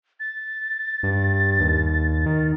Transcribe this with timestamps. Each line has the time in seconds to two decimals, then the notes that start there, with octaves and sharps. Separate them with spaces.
0.20 A6
1.03 G2
1.60 D#2
2.26 D#3